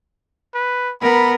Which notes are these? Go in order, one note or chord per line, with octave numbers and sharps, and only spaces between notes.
B4
B3 A#4 B5